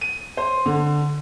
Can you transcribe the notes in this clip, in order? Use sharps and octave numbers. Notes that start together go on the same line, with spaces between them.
D#7
C5
D3